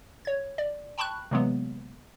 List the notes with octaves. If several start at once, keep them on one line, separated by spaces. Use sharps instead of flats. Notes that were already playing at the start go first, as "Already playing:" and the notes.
C#5 G#6
D5
G5 A5 B5 C#6 F#6
C3 E3 F#3 G#3 A#3 B3